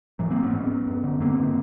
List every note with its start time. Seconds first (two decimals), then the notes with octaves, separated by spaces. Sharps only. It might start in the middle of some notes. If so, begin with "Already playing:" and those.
0.19 G#2 E3 F#3
0.30 A#3 C4
0.43 B3 C#4
0.53 G#2
0.87 G2
1.04 D3
1.20 G2 A#3 C4
1.38 D3